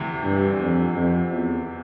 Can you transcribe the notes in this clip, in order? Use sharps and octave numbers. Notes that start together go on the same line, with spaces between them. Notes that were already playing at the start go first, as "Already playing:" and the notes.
Already playing: D2 C3 E3
G2
F2
F2
E2